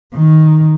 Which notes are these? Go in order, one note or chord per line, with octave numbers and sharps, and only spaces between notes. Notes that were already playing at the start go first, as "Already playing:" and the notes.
D#3